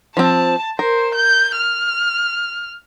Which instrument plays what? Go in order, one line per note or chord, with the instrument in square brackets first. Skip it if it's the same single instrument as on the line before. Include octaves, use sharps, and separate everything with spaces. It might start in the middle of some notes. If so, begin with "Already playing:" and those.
[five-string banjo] F3 C4 [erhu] A5
[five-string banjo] A#4 [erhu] C5
[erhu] G6
F6